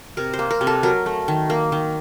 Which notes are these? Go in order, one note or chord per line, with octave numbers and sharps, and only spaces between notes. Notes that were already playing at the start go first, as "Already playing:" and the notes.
C3 A#4
C5
A#3
A#4
C3
A4
F#3 A#4
A3
D#3
A#3
D#3